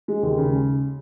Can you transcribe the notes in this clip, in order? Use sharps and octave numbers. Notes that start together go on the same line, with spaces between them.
G#3
D#2
C#3